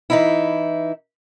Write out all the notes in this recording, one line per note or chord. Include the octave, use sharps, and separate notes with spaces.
E3 D#4 E4